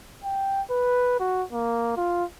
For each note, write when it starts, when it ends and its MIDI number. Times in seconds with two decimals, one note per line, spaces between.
0.24 0.62 79
0.70 1.16 71
1.20 1.43 66
1.52 1.93 58
1.97 2.24 65